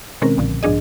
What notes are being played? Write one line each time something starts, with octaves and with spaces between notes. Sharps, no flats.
B2 D#3 G#3 C4 C#4 A#4
B1 A#2 D3 F3
B1 G#2 F3 D4 G#4 D#5